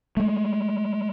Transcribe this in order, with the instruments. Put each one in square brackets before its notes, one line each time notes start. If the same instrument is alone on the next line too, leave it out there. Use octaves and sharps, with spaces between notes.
[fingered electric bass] G#3 A3